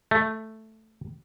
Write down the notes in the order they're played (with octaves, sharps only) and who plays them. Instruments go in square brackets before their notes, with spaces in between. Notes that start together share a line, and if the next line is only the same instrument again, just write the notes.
[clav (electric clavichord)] A3